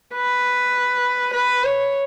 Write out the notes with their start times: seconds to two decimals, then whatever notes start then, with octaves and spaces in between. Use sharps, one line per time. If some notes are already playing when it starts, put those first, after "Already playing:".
0.15 B4
1.33 B4
1.64 C#5